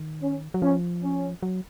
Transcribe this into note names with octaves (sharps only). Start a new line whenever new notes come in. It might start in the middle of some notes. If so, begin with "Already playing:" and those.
Already playing: D#3
C#4
F#3
F3 C#4
C#4
F#3